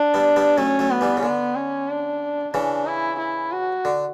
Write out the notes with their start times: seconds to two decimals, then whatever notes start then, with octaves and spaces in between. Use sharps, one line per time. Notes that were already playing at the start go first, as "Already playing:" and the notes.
Already playing: D4
0.14 G3 B3
0.36 G3 B3
0.58 F#3 A3 C#4
0.79 F#3 A3
0.91 B3
1.01 E3 G3
1.17 C#3
1.23 D3 B3
1.56 C#4
1.89 D4
2.54 C#3 E3 D4
2.87 E4
3.19 E4
3.52 F#4
3.85 D3